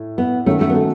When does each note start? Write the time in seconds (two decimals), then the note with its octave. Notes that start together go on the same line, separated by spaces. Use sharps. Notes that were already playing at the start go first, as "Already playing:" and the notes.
Already playing: A2
0.18 B3
0.46 F#2 D#3 F#3 A3 C#4 F#4
0.61 A3
0.69 B3
0.75 A3